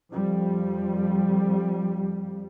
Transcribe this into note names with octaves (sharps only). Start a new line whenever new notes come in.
F2 F3 G3